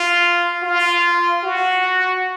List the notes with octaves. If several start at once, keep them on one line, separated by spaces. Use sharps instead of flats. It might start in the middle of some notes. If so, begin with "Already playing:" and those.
Already playing: F4
F4
F#4